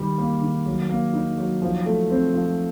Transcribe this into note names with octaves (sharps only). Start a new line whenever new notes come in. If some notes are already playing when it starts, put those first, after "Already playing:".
Already playing: D#3 G3
A#3
D#3
F#3
A#3
D#4
F#3
F3
A3
C4
F3